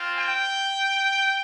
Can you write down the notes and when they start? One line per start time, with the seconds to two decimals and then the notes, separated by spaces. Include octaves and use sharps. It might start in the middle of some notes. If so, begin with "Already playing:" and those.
Already playing: C4 F4
0.16 G5